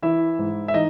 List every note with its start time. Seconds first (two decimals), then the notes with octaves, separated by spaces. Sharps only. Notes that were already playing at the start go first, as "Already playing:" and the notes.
0.02 E3 E4 E5
0.39 G#2
0.68 E5
0.74 E3 D#4 D#5